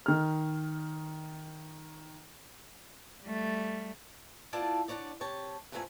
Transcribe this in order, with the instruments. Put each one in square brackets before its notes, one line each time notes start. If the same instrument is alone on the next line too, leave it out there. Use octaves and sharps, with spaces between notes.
[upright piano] D#3 F6
[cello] G3 A3
[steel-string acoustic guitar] A3 B3 E4 F4 D5 A5
D3 D4 D#4 C#5 D5
C3 G4 C#5 A5
G2 A#2 E3 A3 C4 G#5